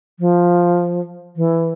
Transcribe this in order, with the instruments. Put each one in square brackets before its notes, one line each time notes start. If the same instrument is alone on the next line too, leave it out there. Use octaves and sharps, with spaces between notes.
[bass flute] F3
E3